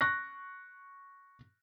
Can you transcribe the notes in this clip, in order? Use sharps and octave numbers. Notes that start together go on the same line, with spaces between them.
C#6 F#6 A#6